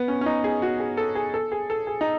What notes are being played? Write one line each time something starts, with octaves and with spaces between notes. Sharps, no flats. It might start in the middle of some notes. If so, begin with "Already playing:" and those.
Already playing: B3
C#4
C#4
D#4
G#4
F#4
G#4
A4
G#4
A4
G#4
A4
G#4
D#4